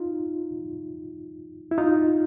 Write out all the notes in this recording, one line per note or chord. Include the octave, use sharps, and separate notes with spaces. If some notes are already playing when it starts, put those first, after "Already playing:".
Already playing: D#4 F4
E4
D#4 F4